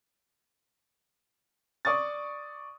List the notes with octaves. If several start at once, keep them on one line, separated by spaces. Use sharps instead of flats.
D5 C#6 D#6 A6